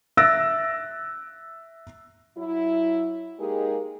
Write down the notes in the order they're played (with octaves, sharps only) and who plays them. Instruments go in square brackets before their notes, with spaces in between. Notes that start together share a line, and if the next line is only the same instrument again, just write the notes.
[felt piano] E5 E6 F#6 A6 A#6 D7
[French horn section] F#3 E4
G#3 A#3 D#4 G4 G#4 A#4